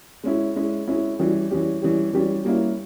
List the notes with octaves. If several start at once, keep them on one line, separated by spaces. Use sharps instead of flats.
G#3 C#4 E4
G#3 C#4 E4
G#3 C#4 E4
E3 G3 C#4 G4
E3 G3 C#4 G4
E3 G3 C#4 G4
E3 G3 C#4 G4
G3 A#3 C#4 E4